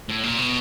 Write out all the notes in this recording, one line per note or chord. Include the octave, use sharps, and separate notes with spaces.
A2
A#2
B2